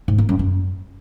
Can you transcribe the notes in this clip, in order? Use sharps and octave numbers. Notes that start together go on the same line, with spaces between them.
G#2
A#3
F#2
F#2